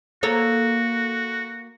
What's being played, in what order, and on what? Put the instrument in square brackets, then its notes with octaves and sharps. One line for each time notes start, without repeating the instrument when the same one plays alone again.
[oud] A#3 A4 C#5 [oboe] F#4